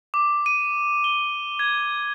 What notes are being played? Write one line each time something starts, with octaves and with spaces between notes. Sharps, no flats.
D6
D#7
G7
G#6